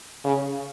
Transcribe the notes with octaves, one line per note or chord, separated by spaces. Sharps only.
C#3